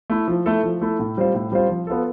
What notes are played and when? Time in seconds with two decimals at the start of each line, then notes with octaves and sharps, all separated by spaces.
0.10 A3 E4
0.28 F3
0.46 A3 E4 A4
0.63 F3
0.82 A3 E4 A4
0.99 A2
1.17 G3 C4 F4 C5
1.34 A2
1.52 G3 C4 F4 C5
1.69 F3
1.87 B3 F4 A4